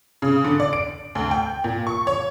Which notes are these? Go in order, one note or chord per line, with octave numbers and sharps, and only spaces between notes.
C#3
D3
D5
D7
D2
G5
A#2
C#6
C#5